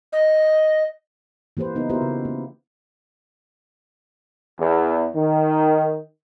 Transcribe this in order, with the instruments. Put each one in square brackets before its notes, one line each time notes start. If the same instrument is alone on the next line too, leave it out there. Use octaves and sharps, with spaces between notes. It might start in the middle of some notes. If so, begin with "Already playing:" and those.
[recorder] D#5
[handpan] E3 A#3 G4 B4 C5
C#3 B3 D#4 E4 B4
B3 E4 F#4 G4 A#4 C5
C#3
A#3
[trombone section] E2
D#3